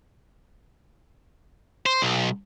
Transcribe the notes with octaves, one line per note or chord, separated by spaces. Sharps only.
C5
B1